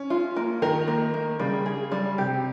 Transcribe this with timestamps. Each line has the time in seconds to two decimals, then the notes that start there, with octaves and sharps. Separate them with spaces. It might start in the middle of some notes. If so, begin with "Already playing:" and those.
Already playing: C#4
0.10 F4
0.36 A#3
0.62 D#3 A#4
0.88 A#3
1.14 A#3
1.39 C#3 G3
1.66 G#4
1.92 G3
2.18 C3 G4